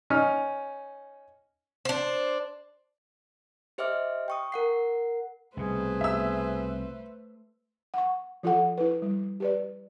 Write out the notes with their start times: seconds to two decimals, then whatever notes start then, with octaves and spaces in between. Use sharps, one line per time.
0.10 C#4 D#4 F6
1.85 D4 C5
3.78 G4 C5 D#5 E5 D6 F6
4.28 G5 C#6 D#6
4.52 A#4 F#5 C7
5.57 C2 B2 A3 G#4 B4 C5
6.01 E5 E6
7.94 F#5 C#6
8.43 F3 F4 A4 F#5
8.78 E4 B4
9.02 G3
9.40 G4 B4 D5